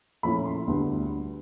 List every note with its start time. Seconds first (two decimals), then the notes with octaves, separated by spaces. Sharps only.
0.23 A#2 F3 A3 C#4 E4 B5
0.45 C6
0.67 D2 D3 G3 B3 D4